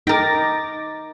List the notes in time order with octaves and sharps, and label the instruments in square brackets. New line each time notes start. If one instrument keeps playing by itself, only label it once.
[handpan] D#4 [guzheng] A#4 G5 [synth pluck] D6 A6 A#6